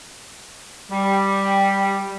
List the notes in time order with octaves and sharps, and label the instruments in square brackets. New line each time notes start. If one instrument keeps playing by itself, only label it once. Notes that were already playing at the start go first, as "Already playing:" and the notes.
[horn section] G3